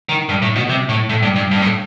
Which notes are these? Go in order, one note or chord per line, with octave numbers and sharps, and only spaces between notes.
D#3
G2
A2
B2
C3
A2
A2
G2
G2
G2
A2